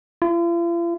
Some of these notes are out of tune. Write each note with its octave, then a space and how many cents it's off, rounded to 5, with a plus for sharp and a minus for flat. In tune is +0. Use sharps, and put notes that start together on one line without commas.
F4 -45